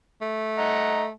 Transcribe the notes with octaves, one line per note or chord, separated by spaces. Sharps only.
A3
D#5 F#5 A#5